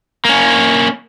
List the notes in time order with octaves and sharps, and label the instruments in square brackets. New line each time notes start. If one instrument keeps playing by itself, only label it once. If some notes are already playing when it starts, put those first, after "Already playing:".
[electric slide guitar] A#3 C#4